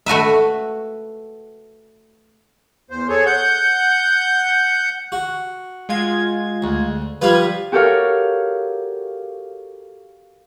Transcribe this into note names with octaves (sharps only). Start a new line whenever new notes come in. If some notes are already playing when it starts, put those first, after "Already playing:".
A3 F#4 B4 E5
E2 C5
G#4 A4 C#5
F#5 G6
F#4
G#3 F4 G#6
D2
F3 G3 F4 B4 G#6
F#4 G4 A4 A#4 C#5 F5